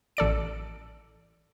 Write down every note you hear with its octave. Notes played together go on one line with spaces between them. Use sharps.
A1 A4 D5 D7